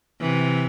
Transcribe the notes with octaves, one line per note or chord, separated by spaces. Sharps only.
C3 E3